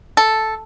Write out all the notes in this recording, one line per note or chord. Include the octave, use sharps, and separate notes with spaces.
A4